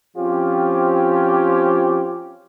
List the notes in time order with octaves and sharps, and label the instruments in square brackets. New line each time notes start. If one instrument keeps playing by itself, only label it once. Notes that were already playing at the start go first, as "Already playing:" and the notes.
[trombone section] F3 C4 C#4 F4 G4